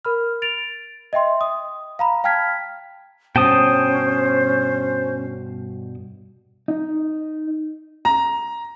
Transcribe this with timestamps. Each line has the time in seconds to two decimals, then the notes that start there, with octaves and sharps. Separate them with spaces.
0.05 A#4 B5 F6
0.42 A6 D7 F7
1.13 D#5 E5 G5 C6
1.41 D#6
1.99 F5 A#5 B5
2.24 F5 G5 A5 F6 G#6 B6
3.36 G2 B2 C#4 C5 G5 A5 D#6
6.68 D#4
8.05 A#5